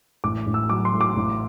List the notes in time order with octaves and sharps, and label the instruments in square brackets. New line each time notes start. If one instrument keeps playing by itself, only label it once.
[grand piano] A1 [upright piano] D6
[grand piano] A1
[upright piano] E6
[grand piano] F#3 [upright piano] D6
[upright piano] C6
[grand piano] A2
[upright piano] D6
[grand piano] A1